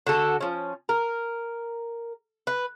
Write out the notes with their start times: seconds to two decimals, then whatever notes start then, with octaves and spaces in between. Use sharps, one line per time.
0.07 D3 F#4 A4
0.41 F3 C#4
0.89 A#4
2.47 B4